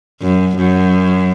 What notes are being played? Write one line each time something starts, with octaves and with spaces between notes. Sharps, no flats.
F#2
F#2